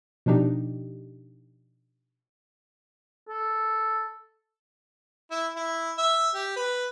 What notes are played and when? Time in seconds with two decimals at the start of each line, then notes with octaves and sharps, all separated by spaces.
0.26 B2 F3 D4 D#4 G4
3.29 A4
5.31 E4
5.56 E4
5.98 E5
6.35 G4
6.56 B4